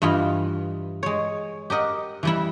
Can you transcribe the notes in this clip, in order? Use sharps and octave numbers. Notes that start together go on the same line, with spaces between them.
G2 E3 F4 D#5 B5
G#3 C#5
G4 A#4 D#5 F#5
E3 G3 E4